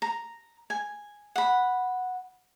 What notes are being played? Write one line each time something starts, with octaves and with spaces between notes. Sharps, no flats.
A#5
G#5
F#5 B5